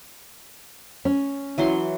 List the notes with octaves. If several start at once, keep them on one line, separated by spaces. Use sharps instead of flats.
C#4
E3 F#3 C6